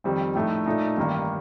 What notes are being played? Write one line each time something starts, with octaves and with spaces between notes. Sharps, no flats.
F2 D#3 G3 C4
A#1 A2 A3 D#4
A#2 A3 D#4
A1 G2 D#3 A#3